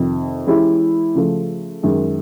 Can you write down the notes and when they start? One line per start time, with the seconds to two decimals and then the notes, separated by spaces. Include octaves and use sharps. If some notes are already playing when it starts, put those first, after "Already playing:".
Already playing: F2 C3 D#3
0.47 E3 G#3 C#4 E4 G4
1.15 C#3 F3 A3
1.83 F#2 D#3 G#3